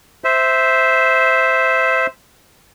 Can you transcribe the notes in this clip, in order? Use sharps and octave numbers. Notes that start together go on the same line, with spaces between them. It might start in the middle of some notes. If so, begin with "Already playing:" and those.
C5 E5